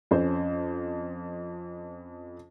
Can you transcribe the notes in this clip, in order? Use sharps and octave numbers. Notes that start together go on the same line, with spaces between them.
F2 C#4 C5